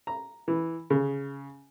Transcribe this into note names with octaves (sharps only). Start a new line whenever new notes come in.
A#5
E3
C#3